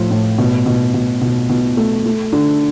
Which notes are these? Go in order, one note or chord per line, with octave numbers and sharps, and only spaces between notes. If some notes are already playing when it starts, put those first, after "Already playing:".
Already playing: A2 F3
A2
B2
B2
B2
B2
B2
A3
A3
D3